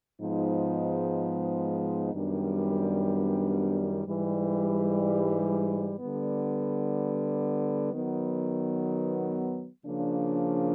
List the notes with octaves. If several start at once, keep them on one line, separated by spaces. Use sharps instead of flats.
G#2 F3 G#3 B3 D#4
F#2 D#3 G3 B3 D4
G#2 E3 G3
D3 G3 B3
D#3 F#3 B3
C#3 F3 A#3 D4